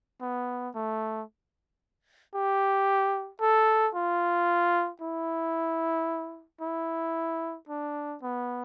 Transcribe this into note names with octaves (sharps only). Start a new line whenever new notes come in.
B3
A3
G4
A4
F4
E4
E4
D4
B3